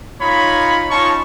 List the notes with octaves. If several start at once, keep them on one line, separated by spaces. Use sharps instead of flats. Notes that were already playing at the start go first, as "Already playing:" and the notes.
D#4 F4 C#5 B5
C#4 D#4 F4 A5 C#6